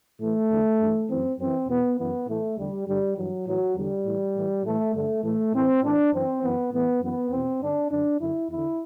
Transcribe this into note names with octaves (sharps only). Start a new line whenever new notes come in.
A2 E3 A3
E2 D3
G2 E3
F#2 E3 C4
F#2 E3 C4
E2 B2 B3
F#2 E3 B3
A2 E3 A3
E2 D3 G3
G2 D3 G3
G2 E3 F#3
A2 E3 F#3
E2 D3 G3
A2 E3
A2 E3
A2 E3 A3
G2 D3 A3
A2 E3 A3
A2 E3 C4
A2 E3 D4
F#2 E3 C4
F#2 E3 B3
A2 E3 B3
F#2 E3 B3
E2 B2 C4
G2 D3 D4
F#2 D3 D4
F#2 D3 E4
E2 D3 E4